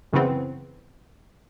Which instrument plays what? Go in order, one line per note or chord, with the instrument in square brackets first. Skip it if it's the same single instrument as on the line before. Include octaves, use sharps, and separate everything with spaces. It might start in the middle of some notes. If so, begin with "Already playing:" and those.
[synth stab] F#2 C#3 E3 B3 C4